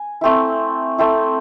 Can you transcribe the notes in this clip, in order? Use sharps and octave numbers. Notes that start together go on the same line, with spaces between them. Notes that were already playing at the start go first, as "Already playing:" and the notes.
Already playing: G#5
A3 C4 E4
A3 C4 E4